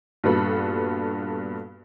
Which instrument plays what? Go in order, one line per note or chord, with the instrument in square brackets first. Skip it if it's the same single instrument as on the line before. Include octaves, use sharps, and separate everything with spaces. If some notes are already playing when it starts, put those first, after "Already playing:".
[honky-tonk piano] G2 A#2 B3 F#4 A4 B5